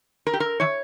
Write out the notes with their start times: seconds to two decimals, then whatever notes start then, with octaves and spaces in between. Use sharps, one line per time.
0.27 A#4
0.33 G4
0.40 A#4
0.60 E3 C#5